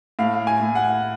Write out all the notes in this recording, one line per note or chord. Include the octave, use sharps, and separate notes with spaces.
A2 F5
G#5
A2
F#5